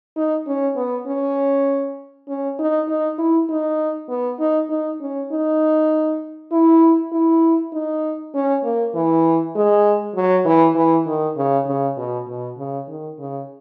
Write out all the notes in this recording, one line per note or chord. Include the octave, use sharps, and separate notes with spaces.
D#4
C#4
B3
C#4
C#4
D#4
D#4
E4
D#4
B3
D#4
D#4
C#4
D#4
E4
E4
D#4
C#4
A#3
E3
G#3
F#3
E3
E3
D#3
C#3
C#3
B2
B2
C#3
D#3
C#3